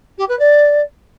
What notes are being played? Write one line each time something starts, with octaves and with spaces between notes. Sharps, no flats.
G4
B4
D5